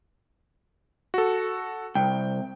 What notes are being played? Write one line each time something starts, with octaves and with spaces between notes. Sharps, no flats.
F#4 A4
C2 G5